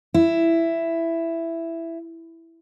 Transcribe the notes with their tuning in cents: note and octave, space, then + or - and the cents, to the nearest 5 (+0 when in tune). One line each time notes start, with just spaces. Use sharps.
E4 +10